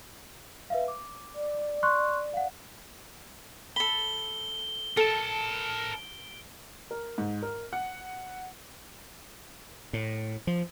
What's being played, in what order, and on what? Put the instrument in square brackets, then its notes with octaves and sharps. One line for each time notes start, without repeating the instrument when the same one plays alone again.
[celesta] B4 E5 F5
D6
[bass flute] D5
[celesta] C6 C#6 F#6
F5 F#5
[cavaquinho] A4 B5 [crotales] G7
[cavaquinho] A4 [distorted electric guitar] A#4 A5 [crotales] D7
[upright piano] A#4
G#2
A#4
F#5
[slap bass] A2
F3